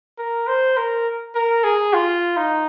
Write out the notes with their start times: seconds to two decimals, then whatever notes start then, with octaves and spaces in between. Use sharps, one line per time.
0.18 A#4
0.47 C5
0.77 A#4
1.35 A#4
1.64 G#4
1.94 F4
2.37 D#4